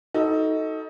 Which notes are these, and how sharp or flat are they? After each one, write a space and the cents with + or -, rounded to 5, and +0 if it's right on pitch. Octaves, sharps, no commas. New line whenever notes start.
D#4 +20 F#4 +10 A4 +0